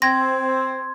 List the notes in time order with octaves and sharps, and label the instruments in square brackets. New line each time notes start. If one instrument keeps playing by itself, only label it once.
[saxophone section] C4 [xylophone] G5 A#6 [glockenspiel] C6 G#6